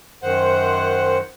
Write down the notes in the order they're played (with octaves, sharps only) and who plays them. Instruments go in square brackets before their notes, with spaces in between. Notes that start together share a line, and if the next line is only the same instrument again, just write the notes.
[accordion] F#2 D#3 C5 F#5